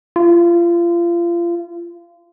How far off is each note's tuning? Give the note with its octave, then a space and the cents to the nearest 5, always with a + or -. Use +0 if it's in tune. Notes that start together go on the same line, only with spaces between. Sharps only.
F4 -30